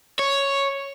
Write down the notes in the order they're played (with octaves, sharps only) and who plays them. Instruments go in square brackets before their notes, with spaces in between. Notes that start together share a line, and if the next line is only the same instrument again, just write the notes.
[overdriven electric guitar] C#5